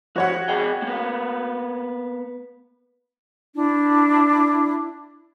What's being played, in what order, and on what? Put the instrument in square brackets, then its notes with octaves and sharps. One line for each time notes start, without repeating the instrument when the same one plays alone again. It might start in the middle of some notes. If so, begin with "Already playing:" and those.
[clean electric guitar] F3 G4 [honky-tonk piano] F#4 C#5 F#5
[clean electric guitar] G#4 D#5 G5
A#3 B3
[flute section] D4 E4